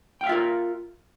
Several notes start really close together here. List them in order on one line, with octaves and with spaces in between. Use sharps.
G5 F5 E5 F4 A#4